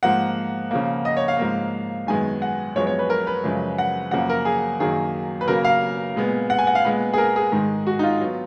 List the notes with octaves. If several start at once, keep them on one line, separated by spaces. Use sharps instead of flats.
G#2 F3 A#3 F#5
C#3 F3 A#3
D#5
C#5
F5
G#2 F3 A#3
F#2 D#3 G#3 B3 G#5
F#5
F#2 F3 G#3 B3 C#5
C#5
B4
A#4
B4
F#2 C#3 F3 G#3
F#5
F#2 C#3 F3 A#3 F#5
A#4
G#4
F#2 D#3 F#3 A#3 G#4
B4
C#3 F#3 A#3 A#4
F5
A#2 G#3 B3
F#5
G#5
F#5
F5
A#2 G#3 B3 B4
G#4
A#4
G#4
G#2 D#3 G#3
F#4
D#4
F4
F#3 B3